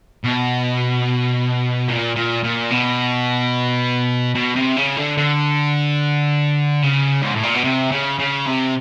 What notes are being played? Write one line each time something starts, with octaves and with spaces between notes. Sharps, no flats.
B2
A#2
A#2
A#2
B2
B2
C3
C#3
D3
D3
C#3
G#2
A2
A#2
B2
C3
C#3
C#3
C3